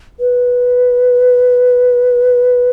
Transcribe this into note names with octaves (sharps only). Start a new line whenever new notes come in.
B4